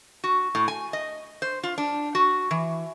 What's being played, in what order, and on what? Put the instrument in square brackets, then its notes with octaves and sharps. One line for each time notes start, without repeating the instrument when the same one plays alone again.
[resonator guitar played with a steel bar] F#4
A2
G#5
D#5
C5
F4
D4
F#4
E3